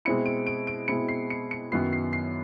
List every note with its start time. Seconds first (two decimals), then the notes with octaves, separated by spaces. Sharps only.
0.05 B2 G#3 C4 E4 C#7
0.26 D7
0.47 D7
0.67 D7
0.88 B2 G#3 C4 E4 C#7
1.08 C7
1.30 C#7
1.51 C#7
1.72 F#2 D#3 F#3 B3 E4 C7
1.93 C7
2.13 C7